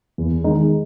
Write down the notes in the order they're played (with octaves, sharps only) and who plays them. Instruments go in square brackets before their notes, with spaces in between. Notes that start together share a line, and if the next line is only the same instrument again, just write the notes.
[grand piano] E2
D#3 G#3 D#4 G#4